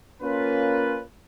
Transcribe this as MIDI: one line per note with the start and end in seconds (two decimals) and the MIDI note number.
0.22 1.02 58
0.22 1.02 61
0.22 1.02 65
0.22 1.02 71